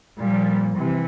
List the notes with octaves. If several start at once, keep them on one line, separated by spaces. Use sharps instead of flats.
A#2 F3 G3
C3 E3